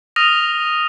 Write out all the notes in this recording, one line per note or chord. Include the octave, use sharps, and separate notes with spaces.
D#6 F6 A#6 D#7 F7